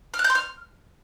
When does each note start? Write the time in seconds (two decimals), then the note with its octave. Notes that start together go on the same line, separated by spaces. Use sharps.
0.14 F6
0.19 F#6
0.24 G6
0.30 C6
0.35 F6